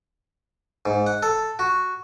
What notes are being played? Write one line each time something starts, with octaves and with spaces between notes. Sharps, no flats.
G#2
F#5
A4
F#4